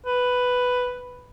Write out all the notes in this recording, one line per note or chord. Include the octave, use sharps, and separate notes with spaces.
B4